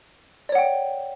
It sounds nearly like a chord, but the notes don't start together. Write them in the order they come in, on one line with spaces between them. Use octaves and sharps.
D5 C#5 F#5 G5